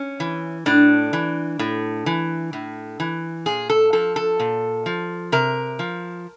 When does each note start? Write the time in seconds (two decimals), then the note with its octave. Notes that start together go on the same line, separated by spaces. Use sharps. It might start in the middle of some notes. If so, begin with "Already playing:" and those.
Already playing: C#4
0.20 E3
0.66 A2 D4
1.13 E3
1.59 A2
2.06 E3
2.53 A2
3.00 E3
3.46 A#2 G#4
3.70 A4
3.93 F3 A4
4.16 A4
4.40 A#2
4.86 F3
5.32 C3 A#4
5.79 F3